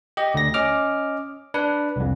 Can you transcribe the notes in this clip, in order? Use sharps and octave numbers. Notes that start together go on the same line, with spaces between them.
G4 D#5
D2 A#6
C#4 D#5 D6 F6
D4 B4
C2 F2